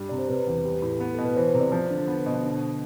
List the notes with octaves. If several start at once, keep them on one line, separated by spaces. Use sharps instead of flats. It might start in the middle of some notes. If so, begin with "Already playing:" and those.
Already playing: G2 G3
C3 D5
C5
C3 B4
E2
G3
A2
B3
B2 A4
B4
E3 C5
C5
C3
D5
F3 C5
D3
B3
B2
D3